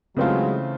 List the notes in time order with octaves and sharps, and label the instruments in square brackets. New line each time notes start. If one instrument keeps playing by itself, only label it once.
[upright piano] C#3 E3 A3 C4 F4 [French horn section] F#3 G#3